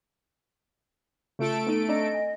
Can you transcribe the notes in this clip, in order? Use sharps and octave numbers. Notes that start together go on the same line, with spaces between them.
C#3 A3 F4 A4 D7
B3 D#4 D#7
C4 D4 D#5 A#5
G#5